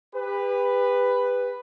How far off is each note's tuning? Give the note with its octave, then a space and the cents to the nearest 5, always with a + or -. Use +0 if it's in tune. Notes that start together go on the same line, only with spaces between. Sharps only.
G4 +40 B4 +5